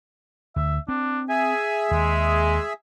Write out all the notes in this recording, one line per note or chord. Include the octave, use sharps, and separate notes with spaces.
D2 E5
C4 D4
G#4 E5 G#5
D#2 G#3